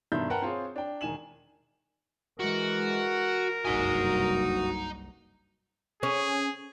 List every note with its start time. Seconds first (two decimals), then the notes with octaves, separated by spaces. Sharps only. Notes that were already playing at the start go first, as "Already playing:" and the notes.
0.12 G2 B2 D#3 E5 C6 G6
0.30 A#4 B4 F#5 G5 A5 A#5
0.42 C4 F4 G#4 C#5
0.76 D4 G5
1.01 E1 D#3 G#5 E7 F#7
2.40 E3 G#3 F#4 A#4
3.65 F#1 C2 G2 D#4 F#4 G#5 D#6
6.03 C#4 G#4